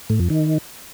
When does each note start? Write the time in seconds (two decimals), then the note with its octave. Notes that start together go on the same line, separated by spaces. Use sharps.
0.10 A2
0.20 F2
0.30 D#3